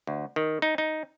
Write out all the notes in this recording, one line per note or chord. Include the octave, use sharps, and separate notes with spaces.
D2
D#3
D#4
D#4